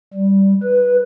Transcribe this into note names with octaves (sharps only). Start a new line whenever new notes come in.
G3
B4